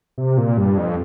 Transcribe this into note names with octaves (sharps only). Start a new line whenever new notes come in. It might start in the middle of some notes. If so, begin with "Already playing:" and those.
C3
A#2
G2
F2